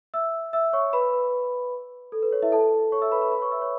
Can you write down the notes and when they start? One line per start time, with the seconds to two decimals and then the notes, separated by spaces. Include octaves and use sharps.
0.14 E5 E6
0.53 E5 E6
0.73 C#5 C#6
0.93 B4 B5
1.13 B4
2.12 A4
2.23 B4
2.32 C#5
2.42 E4 E5
2.52 A4 A5
2.92 C#5 C#6
3.02 E5 E6
3.12 B4 B5
3.22 B4 B5
3.32 B4 B5
3.42 C#5 C#6
3.51 E5 E6
3.61 C#5 C#6